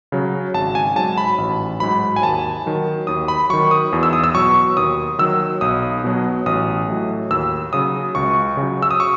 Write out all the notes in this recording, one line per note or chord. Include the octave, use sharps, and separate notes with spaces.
C#3 F#3
G#1 A5
G#5
G#2 F#3 A5
B5
A1
G#2 F#3 B5
G#5
D#2 A5
D#3 F#3
D#2 D#6
B5
D#3 F#3 C#6
D#6
E2
E6
D#6
E6
B2 F#3 C#6
D#2 D#6
D#3 F#3 E6
B1 D#6
B2 F#3
A1 D#6
A2 F#3
D#2 E6
C#3 F#3 D#6
C#2 C#6
C#3
F#3
E6
D#6
C#6